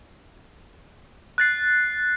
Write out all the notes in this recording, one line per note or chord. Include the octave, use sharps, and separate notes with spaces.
F#6 A6 C7